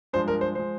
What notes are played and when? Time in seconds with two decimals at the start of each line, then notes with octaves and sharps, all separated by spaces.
0.13 G2 F3 G#3 C5
0.28 A#4
0.41 C5
0.55 F3 G#3 C5